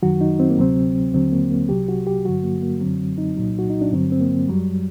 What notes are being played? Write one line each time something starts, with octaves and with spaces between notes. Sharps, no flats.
F#2 D#3 F#3 F#4
D#4
C4
A#3
D2 C3 F#3 C4
D#2 D3 F#3 C4
A#3
A#3
C2 C3 F#3 G4
F#4
G4
G2 D3 F#3 F#4
A#3
A#3
F#2 D3 F#3 C4
D#4
C2 A#2 F#3
F#4
D#4
D4
G2 D3 F#3 C4
C4
A#3
F#2 F#3 G3